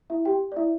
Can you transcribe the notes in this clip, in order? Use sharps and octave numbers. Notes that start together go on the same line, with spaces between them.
E4 E5
G4 G5
D5
E4 E5